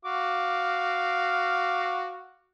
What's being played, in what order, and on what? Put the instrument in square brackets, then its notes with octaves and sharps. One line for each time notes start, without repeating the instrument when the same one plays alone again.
[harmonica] F#4 F5 D6